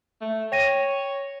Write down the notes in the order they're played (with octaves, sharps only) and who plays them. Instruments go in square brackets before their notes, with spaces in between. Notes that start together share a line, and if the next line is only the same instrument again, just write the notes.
[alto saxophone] A3
[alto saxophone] C#5 [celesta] G5 A#6 D#7